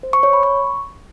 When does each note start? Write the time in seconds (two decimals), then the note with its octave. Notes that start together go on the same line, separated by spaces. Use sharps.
0.03 C5
0.13 C#6
0.23 C#5
0.33 B5
0.43 C#6